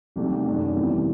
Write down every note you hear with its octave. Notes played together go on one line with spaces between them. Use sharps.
C2 C3 D#3 F#3 A3
F#2 D#3 F#3 A3 D4
E2 C3 E3 G3